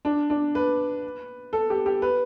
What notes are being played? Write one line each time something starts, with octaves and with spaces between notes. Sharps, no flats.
D4
D4
B4
A4
G4
G4
B4